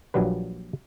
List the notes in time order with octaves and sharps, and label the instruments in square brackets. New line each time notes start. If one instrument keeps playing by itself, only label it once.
[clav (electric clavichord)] A#1 A#2 F#3 G3 B4